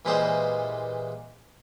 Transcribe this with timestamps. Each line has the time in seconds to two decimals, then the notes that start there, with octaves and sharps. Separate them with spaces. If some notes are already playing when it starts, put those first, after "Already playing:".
0.05 A#2 E3 G3 G#3 C5 D#5